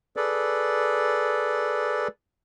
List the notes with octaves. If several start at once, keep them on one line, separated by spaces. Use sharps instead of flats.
G#4 A4 B4 D5